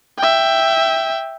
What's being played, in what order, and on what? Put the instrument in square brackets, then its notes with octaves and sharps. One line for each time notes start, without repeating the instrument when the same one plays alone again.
[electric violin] E5 G5